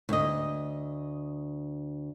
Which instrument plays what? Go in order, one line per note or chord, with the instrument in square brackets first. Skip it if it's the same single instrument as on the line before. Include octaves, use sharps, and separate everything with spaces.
[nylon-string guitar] D2 D#5